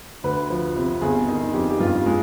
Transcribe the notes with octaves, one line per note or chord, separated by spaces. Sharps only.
D2 B4
F3
C3
G1 G#4
D#3 D#4
F2 G4
G4
G2 F4
G#3